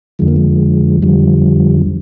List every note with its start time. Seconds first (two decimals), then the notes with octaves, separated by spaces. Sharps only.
0.19 F2 D3 F3 G#3
0.28 A#3
0.36 G#3
1.02 F2 D3 F3 G3